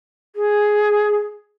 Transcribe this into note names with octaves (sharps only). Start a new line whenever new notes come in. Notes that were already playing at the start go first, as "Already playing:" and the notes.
G#4